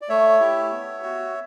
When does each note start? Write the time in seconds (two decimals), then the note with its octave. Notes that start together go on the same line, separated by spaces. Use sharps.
0.02 D5
0.09 A3 C#5 E5
0.40 E4 G4
0.72 B3
1.03 F#4